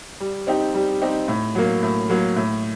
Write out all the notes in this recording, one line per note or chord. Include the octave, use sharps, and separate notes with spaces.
G3
C4 D#4 G4
G3
C4 D#4 G4
A2
F#3 A#3
A2
F#3 A#3
A2